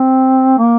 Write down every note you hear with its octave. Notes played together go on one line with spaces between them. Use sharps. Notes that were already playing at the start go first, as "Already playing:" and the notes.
Already playing: C4
A#3